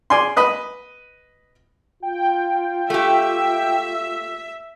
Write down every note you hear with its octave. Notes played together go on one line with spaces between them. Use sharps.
G#4 D5 G#5 C6
B4 D#5 B5
F4 G5
A3 G4 E5